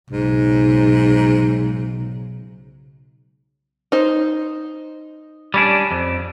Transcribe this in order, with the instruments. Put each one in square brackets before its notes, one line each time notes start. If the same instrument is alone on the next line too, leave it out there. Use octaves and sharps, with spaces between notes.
[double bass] B1 C#3 [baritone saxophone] G#2
[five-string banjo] D#4 C5
[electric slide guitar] G3 C#4 D4
F2